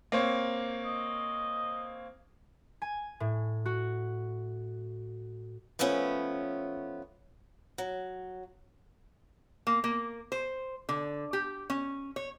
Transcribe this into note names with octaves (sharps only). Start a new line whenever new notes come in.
A#3 C4 C#5
D#5
G#5
A2
F#4
F3 A3 B3 C#4
F#3
A#3
A#3
C5
D3
G4
C#4
C#5